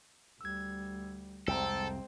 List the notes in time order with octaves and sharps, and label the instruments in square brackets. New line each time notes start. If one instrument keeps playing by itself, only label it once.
[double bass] D2 G3 [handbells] E6 G#6
[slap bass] C2 F2 [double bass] G#3 C4 [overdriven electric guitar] A4 [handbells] G5 A#5